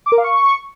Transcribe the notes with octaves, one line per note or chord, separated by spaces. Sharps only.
D6
A#4
F5
C#6